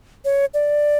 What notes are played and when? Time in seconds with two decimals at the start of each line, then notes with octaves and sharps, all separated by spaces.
0.25 C#5
0.54 D5